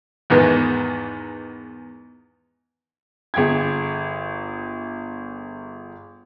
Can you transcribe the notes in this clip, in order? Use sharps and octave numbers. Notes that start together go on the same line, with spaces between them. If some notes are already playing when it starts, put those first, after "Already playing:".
E2 G#2 D#3 B3
G1 G#4 G5 G#6